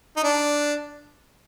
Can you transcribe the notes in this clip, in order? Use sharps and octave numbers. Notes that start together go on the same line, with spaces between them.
D#4
D4